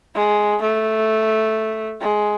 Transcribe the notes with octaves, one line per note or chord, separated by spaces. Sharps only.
G#3
A3
G#3